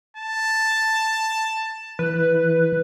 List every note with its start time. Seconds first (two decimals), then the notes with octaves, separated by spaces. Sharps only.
0.17 A5
1.99 E3 B4